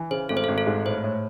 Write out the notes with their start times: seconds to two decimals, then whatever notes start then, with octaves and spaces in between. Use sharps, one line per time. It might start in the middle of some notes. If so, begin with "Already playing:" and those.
Already playing: E3
0.11 C#3 C5
0.29 G#1 A4
0.37 C5
0.44 G#1 A4
0.58 A4
0.67 G#2
0.86 A2 C5
1.04 A2